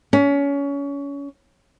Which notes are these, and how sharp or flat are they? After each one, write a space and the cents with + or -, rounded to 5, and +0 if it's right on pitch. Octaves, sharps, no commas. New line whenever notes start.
C#4 +25